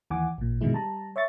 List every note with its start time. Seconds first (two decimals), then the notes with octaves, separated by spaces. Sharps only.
0.10 D#2 E3 F#5 G#5 D6
0.38 A1 A#2
0.61 G2 B2 D3 D#3 G#3 E4
0.73 G3 A5 A#5
1.16 C#5 E5 C#6 A6